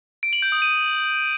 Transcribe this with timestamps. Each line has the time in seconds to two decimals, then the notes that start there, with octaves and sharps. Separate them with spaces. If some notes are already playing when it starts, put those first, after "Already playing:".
0.23 D7
0.33 F#7
0.42 G6
0.52 D#6
0.62 D#7